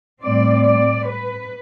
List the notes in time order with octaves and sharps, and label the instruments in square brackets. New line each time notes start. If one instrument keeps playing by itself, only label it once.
[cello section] A2 G3 C4 D5
D5
B4